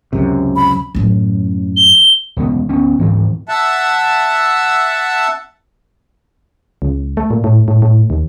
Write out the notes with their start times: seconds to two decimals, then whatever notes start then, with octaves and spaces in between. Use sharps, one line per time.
0.13 C#2 F#2 C3
0.56 B5
0.95 F#2 A2
1.76 G7
2.36 E1 C#2 B3
2.69 D2 B3 C#4
2.99 D2 G#2 E3 C4
3.49 E5 F#5 A5 E6
6.82 C#2
7.17 A3
7.30 A#2
7.44 A2
7.68 A2
7.82 A2
8.10 D#2